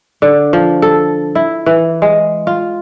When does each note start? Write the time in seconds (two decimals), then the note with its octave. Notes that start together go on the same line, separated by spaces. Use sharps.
0.22 D3
0.53 F3
0.82 A4
1.35 E4
1.66 E3
2.02 G#3
2.47 F4